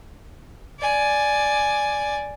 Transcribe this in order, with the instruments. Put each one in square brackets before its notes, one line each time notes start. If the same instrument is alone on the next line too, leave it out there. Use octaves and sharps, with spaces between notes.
[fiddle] D5 G#5